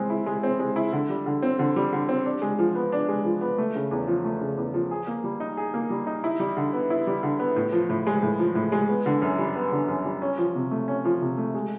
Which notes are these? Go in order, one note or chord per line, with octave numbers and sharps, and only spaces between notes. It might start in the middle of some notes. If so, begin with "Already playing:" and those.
Already playing: G#3 C4
E4
G#3
C4
G#3
E4
D3
G3
D3
C4
D3
G3
D3
C4
D4
G#3
F3
B3
D4
G#3
F3
B3
A3
C#3
E2
F3
A3
C#3
E2
F3
G#4
A#3
G3
D#4
G#4
A#3
G3
D#4
E4
G3
D3
B3
E4
G3
D3
B3
A2
F3
A2
G#3
A2
F3
A2
G#3
B3
D3
F#2
G3
B3
D3
F#2
G3
C#4
F3
C3
A3
C#4
F3
C3
A3
G#3